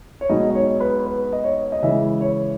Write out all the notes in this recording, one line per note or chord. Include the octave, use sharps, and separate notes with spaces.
C#5
B1 B2 G#3 D#4 D#5
D#5
C#5
B4
B4
D#5
C#5
D#5
C#3 E3 G#3 E5
C#5